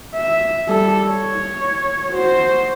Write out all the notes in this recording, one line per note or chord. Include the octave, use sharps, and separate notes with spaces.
E5
G3 A4
C#5
F#4 C5